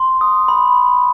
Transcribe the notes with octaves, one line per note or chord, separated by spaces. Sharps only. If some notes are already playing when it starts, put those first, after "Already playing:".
Already playing: C6
D#6
B5